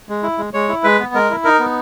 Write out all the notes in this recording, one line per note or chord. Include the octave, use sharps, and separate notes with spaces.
G#3
E4
G#3
G#3 C#5
E4
G#3 B4
B3
G#3 A#4
E4
D#4 A#4
B3